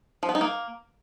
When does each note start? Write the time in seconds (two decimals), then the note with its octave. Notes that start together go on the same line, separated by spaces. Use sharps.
0.23 F3
0.29 B3
0.35 D#4
0.41 A#3